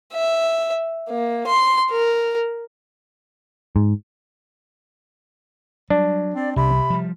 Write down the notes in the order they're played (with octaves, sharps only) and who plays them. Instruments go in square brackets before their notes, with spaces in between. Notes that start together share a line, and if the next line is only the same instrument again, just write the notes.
[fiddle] E5
A#3
C6
A#4
[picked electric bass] G#2
[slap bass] F#3 [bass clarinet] G3 [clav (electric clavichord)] D4
[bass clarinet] C4 [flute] D5
[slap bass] C2 [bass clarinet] C3 [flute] B5
[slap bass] F3 G3